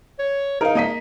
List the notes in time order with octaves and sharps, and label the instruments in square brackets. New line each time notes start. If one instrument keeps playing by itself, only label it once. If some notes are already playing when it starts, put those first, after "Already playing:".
[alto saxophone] C#5
[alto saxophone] D#4 [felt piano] A#4 F5
[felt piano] A#3 D#5 B6